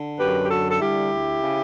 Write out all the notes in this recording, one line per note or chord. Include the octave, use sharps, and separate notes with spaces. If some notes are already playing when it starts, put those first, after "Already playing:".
Already playing: D3
F#2 G4 B4
G4
D3 F#4 A4
A4
G3 E4 G4
D2
C#3